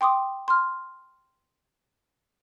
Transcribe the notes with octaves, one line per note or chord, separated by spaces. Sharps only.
G5 C6 D6 D#6
C6 F6